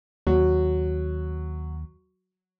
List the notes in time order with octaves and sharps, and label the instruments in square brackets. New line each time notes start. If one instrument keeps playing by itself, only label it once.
[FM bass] D#2 [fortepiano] F#3